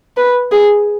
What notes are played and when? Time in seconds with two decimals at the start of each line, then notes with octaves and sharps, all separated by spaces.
0.17 B4
0.52 G#4